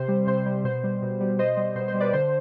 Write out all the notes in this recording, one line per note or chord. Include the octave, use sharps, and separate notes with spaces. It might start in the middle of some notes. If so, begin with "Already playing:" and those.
Already playing: C3 C5
G3
C3 C5
C5
G3
B2 C5
G3
B2
G3
B2 C5 D#5
G3
B2 C5
C5
G3
B4 D5
D3 C5